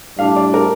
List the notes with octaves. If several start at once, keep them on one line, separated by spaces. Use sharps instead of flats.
A2 G3 D4 F5
D5
A#4